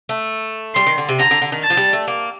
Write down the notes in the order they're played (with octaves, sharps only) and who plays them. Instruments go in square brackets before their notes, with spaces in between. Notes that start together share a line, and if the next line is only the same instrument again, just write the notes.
[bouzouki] A3
[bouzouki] G3 [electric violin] C6
[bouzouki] D#3
D3
C3
[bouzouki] D3 [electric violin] A#5
[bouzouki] D3
D3
D#3
[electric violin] A5
[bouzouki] F3
G3
A3
A#3